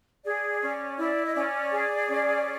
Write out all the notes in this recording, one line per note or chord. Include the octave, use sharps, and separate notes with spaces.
G#4 D5
C#4 D5
E4 D5
D#5
C#4 D5
G#4
C#4